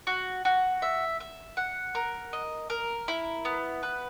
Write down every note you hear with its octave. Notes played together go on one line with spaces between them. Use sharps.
F#4
F#4
E5
E5
F#5
A#4
D#5
A#4
E4
B3
B4